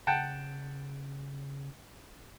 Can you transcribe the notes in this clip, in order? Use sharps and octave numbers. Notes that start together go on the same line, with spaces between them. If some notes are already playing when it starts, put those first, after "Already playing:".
C#3 F#5 G5 A5